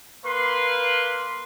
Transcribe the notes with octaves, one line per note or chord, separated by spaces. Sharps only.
A#3 B4 C6